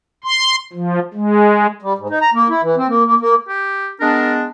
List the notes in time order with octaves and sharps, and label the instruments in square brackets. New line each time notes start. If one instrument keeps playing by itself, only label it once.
[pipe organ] C6
F3
G#3
[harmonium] G3
G#2
D#4
A#5
A#3
E4
E3
C4
A#3
A#3
A#3
[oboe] G4
[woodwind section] G#3 B3 D4 [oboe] A#4